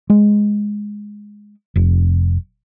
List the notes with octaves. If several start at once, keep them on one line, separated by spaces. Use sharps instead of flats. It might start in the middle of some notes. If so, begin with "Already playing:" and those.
G#3
F1